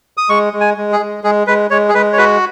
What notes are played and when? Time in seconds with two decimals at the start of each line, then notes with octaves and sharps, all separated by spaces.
0.17 D#6
0.29 G#3 C#6
0.53 G#3
0.61 G#5
0.77 G#3
0.92 G#4
1.00 G#3
1.24 G#3 G#4
1.47 G#3 B4
1.70 G#3 C#5
1.89 G#4
1.95 G#3 B4
2.12 C#5
2.18 F#4 B4